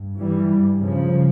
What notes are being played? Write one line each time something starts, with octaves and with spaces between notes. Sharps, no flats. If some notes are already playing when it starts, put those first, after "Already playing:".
Already playing: G2
E3 G3
G2
C#3 F3